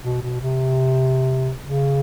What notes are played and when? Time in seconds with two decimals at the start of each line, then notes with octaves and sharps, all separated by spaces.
0.05 B2
0.22 B2
0.41 C3
1.64 C#3